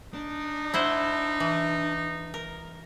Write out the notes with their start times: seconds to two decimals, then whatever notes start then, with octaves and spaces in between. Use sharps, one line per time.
0.14 D4 D#4
0.74 E4 C5 F#5
1.40 E3
2.34 A#4